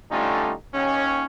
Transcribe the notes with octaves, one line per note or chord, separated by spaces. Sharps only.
D3 G3 A3 C#4 D#4 F4
D#2 C#4